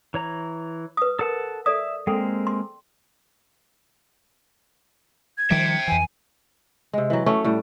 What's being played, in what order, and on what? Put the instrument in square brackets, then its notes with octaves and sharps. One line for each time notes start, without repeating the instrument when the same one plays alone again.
[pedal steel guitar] E3 C#5 A#5
[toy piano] B4 D#6
[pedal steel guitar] A4 F#5 A5 [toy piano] A#4
[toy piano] A4 D5 D#6 [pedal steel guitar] E5
[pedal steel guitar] G#3 A#3 C4 [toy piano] A4 G5
[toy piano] C6
[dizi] G#6
[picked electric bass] D#3 F3 G3 [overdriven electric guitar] E5 G5
[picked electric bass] F2 E3 [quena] G#5
[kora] C3 G#3
E3 F#3
F#3 A3 C#4
A2 G3